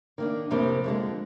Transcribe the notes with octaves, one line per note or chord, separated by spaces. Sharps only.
D#3 A#3 D4
F2 C3 G3 A#3
F2 D3 G#3